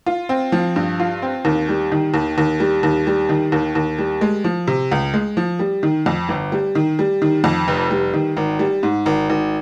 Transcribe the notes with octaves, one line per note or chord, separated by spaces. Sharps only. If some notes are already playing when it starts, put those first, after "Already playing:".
F4
C4
F3
G2
F4
C4
D#2
G3
D#3
D#2
D#2
G3
D#2
G3
D#3
D#2
D#2
G3
G#3
F3
C3
C#2
G#3
F3
G3
D#3
F2
G1
G3
D#3
G3
D#3
F2
F1
G3
D#3
G#1
G3
G#2
G#1
G#1